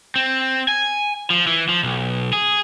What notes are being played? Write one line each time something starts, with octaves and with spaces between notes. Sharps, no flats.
C4
G#5
F3
E3
F3
B1
G#4